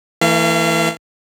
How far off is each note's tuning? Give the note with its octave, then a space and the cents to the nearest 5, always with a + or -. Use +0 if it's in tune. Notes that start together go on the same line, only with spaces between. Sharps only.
E3 +0 A3 +40 F5 -35